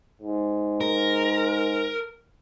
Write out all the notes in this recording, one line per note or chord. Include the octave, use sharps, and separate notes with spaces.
G#2
A#4